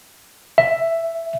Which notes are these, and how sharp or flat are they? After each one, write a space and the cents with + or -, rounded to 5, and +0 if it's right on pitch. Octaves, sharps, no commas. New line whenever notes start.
E5 +5